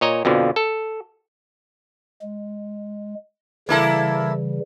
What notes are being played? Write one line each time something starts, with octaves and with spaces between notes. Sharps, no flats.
A#2 C#5 D#5 A#5
F2 B2 D3 F3
A4
G#3
C#3 E3 G3 A#3 E4 A4